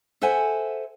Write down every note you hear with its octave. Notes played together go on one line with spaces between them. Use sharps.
A4 C5 E5 F#5 G#5